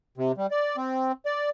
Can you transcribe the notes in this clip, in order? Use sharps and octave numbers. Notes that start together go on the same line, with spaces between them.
C3
G3
D5
C4
D5